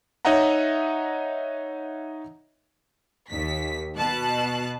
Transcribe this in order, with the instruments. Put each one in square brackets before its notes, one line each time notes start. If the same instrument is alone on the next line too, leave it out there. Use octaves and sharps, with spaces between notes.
[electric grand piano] D#4 C#5 D#5 E5 F#5 A#5
[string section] D#2 B6
B2 A5 F#6